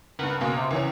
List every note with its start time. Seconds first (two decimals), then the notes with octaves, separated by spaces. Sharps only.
0.19 C#2 G2 A#4 B4 F#5
0.41 C#2 B2 G#3 A#3
0.57 C3
0.71 C#2 E3 C#4